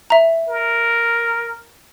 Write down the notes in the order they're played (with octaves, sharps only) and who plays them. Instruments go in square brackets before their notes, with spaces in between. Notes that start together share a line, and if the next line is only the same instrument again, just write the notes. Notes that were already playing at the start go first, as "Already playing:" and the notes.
[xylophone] E5 A#5
[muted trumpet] A#4